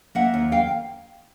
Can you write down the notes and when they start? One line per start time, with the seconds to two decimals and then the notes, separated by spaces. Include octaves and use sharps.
0.15 A#3 E5 F#5
0.34 D#2
0.52 F5 G5